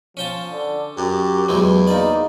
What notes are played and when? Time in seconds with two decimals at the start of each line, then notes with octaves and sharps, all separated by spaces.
0.17 F3 C#4 G5 A5
0.50 D3
0.97 F#2 G4
1.49 E2 F#3 G#3
1.87 A#3 D#4 D5